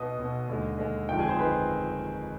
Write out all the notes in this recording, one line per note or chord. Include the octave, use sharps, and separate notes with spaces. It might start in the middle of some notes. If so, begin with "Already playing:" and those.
Already playing: B1 B2 B3 D#5 D#6
B1 B2 B3
D#2 D3 G#3
D#2 D3 G#3
G1 F2 D#3 G#3 G5
G#4 G#5
C5 C6
G1 F2 D#3 G#3 B4 B5